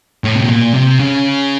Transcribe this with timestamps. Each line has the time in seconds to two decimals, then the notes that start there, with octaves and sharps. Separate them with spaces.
0.24 A2
0.35 C3
0.42 B2
0.50 A#2
0.74 C3
0.99 C#3